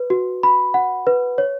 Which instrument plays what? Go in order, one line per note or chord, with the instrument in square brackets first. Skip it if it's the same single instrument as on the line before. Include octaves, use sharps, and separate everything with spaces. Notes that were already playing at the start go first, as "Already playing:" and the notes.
Already playing: [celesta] B4
F#4
B5
F#5
B4
C#5